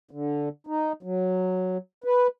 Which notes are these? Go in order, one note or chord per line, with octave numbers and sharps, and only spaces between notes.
D3
D#4
F#3
B4